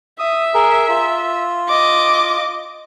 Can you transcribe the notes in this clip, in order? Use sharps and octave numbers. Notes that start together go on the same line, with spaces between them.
E5 D#6
G#4 A#4
F4
D#5 D6